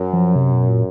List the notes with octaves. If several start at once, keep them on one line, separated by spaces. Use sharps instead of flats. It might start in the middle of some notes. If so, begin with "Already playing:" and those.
Already playing: F#2
F3
C3
B2
A#2